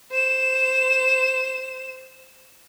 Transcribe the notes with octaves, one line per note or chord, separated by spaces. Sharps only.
C5 E7